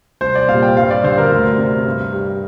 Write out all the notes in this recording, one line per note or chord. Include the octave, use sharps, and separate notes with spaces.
C2 C5
D5
A#2 G3 F5
G5
G2 F5
D5
D3 G3 C5
A#4
D2
C3 G3
G2
G3